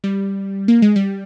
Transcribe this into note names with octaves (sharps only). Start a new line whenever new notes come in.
G3
A#3
G#3
G3